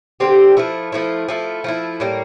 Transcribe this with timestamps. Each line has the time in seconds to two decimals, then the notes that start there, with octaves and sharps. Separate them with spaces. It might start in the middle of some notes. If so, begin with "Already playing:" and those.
0.20 D3 G3 C4 G4
0.57 F3 A3 E4
0.92 F3 A3 E4
1.28 F3 A3 E4
1.64 F3 A3 E4
2.00 A2 G3 A#3